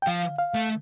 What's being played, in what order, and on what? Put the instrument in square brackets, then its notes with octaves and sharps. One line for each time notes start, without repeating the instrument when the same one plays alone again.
[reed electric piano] G5
[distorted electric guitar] F3 [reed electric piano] F5
[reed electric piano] F5
[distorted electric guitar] A3